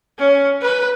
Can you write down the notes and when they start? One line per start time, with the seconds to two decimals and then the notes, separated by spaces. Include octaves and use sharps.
0.19 C#4
0.62 B4